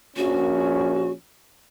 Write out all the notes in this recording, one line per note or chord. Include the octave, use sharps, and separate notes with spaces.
A#1 C#4 F#4